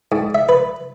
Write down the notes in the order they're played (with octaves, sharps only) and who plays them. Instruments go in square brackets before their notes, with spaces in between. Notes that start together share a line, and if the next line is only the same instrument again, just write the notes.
[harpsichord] G#2
E5
B4